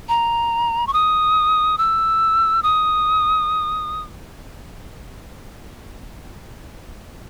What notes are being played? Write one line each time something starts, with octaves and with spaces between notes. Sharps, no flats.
A#5
C#6
D#6
E6
D#6